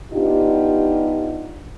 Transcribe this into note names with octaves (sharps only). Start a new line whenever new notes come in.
B3 D4 D#4 F4 G4